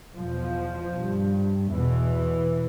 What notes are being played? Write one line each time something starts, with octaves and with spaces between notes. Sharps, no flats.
E2 B2 F3
G2
E2 B2 E3